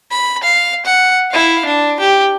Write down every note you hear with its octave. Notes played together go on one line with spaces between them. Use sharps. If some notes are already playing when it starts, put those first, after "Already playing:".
B5
F5
F#5
E4 F5
D4
G4